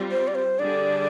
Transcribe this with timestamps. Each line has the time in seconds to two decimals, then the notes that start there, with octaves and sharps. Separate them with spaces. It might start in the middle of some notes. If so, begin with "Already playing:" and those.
Already playing: G3 C4 F4
0.11 C5
0.27 D5
0.35 C5
0.59 D3 G3 D4 G#4 D5